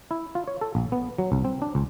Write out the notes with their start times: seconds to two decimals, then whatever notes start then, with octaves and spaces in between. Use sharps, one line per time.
0.11 E4
0.35 F4
0.48 C#5
0.61 A4
0.75 A#1
0.92 B3
1.18 F#3
1.32 C2
1.44 C4
1.62 D4
1.75 C#2